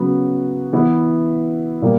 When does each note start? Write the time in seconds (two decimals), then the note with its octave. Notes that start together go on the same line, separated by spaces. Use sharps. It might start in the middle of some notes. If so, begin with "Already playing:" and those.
Already playing: C#3 F#3 B3 F#4
0.73 E3 B3 E4
1.82 A#2 G3 A#3